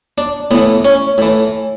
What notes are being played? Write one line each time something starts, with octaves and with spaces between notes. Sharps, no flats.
D4
A2 E3 B3
C#4
A2 E3